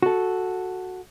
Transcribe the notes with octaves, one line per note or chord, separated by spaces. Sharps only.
F#4 A4